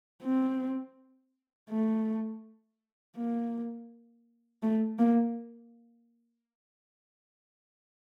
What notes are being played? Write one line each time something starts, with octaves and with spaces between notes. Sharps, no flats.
C4
A3
A#3
A3
A#3